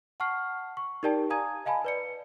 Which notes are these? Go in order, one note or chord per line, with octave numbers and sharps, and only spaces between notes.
F#5 A5 C#6 F6 C7
C#6
D#4 G4 A#4 D5 G5 A5
F5 G#5 A#5 D#6 G#6 D#7
D#5 F5 G#5 A5 B5
B4 D5 C#7